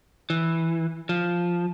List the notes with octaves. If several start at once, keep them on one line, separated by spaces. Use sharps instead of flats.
E3
F3